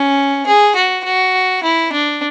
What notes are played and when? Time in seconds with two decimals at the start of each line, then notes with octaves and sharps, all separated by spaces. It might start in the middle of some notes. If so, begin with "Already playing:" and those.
Already playing: C#4
0.47 G#4
0.76 F#4
1.05 F#4
1.63 E4
1.93 D4